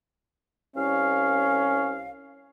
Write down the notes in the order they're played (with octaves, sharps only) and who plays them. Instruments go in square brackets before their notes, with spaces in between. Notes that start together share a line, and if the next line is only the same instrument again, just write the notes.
[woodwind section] C2 F5 [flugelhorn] C#4